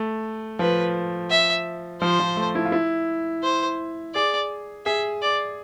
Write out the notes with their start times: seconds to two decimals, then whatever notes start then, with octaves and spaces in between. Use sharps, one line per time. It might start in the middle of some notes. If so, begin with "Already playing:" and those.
Already playing: A3
0.59 F3 B4
1.30 E5
2.01 F3 C5
2.20 F3
2.37 A3
2.55 E4
2.65 F4
2.72 E4
3.43 C5
4.15 G#4 D5
4.86 G#4 E5
5.22 D5